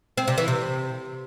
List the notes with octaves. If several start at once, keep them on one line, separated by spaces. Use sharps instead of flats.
C4
C3
E3
C3